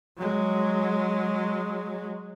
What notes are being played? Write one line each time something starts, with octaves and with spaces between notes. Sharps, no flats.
F#3 G#3